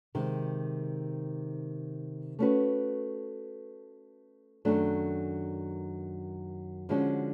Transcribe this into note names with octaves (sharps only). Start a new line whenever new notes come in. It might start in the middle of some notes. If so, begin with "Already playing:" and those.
C3 D#3 G#3
A3 C#4 F#4 B4
F#2 D#3 F#3 A3 D4
D3 F3 G#3 C#4 F#4